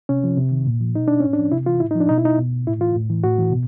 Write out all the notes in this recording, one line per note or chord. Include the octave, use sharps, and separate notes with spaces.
C3 C#4
F3
C3
D#3
A#2
F3
B2 D#4
D4
A2 C#4
D4
F3
C3 E4
E3 F4
A2 E4
D#4
F3 D4
B2 D#4
E4
D#4
B2
A2 E4
E3 F4
A2
E3
A2 F#4
E3
B2